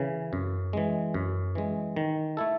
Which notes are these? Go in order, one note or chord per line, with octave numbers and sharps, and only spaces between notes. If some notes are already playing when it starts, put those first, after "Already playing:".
Already playing: C#3 E3
F#2
E3 G#3
F#2
E3 G#3
D#3
A3 E4 A4